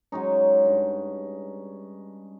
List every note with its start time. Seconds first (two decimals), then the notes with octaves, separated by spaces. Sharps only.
0.12 F#3 G#3 C#4 D#4
0.65 G2